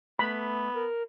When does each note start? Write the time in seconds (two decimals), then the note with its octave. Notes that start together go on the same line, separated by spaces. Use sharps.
0.19 A3 B3 B5
0.74 A#4